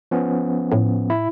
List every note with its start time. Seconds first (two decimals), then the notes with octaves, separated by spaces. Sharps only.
0.11 F3 B3 C#4
0.72 A2
1.10 E4